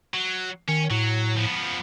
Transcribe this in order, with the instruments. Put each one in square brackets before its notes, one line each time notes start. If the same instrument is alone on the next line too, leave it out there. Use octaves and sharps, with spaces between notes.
[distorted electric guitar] F#3
[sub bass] D#3 [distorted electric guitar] C#4
[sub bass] A2 [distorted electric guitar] F#3
[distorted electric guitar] F3 B3